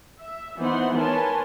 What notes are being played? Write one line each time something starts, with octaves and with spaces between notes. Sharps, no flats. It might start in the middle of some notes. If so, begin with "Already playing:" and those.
E5
E3 B3 D#4 C5 F#5 C6
A#4 B4 C#5 G#5 A5 C6